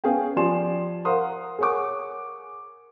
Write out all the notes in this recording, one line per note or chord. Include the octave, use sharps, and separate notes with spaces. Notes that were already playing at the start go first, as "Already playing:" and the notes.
B3 C#4 G#4 F5 G5
F3 G4 D5 G#5 C6 E7
A#4 C5 F5 F#5 C6 D#6
G#4 A#4 C#5 F#5 C#6 D6